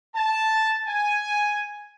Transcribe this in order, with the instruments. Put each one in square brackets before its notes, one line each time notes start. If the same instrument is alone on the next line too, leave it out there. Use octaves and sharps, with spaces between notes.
[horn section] A5
G#5